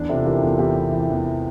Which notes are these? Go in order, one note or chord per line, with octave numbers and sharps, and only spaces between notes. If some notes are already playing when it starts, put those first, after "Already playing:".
Already playing: E2 D4
C3 F4 A4
E3 G4 A#4
E2 F4 A4
E2 E4 G4
C3
E3
E2